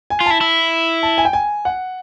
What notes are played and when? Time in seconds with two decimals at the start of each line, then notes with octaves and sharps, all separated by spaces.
0.10 G#5
0.20 F4
0.26 E4 A5
0.41 E4
1.03 A5
1.18 G#5
1.25 G5
1.33 G#5
1.65 F#5